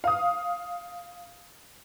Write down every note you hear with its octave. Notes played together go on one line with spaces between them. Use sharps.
F5 D#6